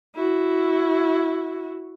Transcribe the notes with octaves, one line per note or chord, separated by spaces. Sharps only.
E4 F#4